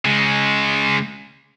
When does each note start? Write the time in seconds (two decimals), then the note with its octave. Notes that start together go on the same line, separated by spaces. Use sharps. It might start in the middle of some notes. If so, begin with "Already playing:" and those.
0.05 C#3 G#3